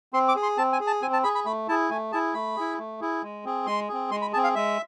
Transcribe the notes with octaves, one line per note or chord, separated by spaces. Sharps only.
C4 C6
D6
G#4
C6
C4 A5
G#5
G#4
A5
C4 G#5
A5
G#4 B5
B5
A3 B5
E4 G#4 A5
A3 G#5
E4 G#4 A5
A3 B5
E4 G#4
A3
E4 G#4
G#3
C4 G#4
G#3 C6
C4 G#4
G#3 C6
B5
C4 G#4 A5
F5
G#3 E5